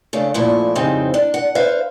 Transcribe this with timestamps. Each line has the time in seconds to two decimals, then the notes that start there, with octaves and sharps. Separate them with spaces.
0.13 C#3 A3 D4
0.34 A#2 F3 A3 E4
0.75 F2 G#2 C#3 G3 C4 D#4
1.14 D4
1.34 F#5
1.55 B4 C5 E5 F5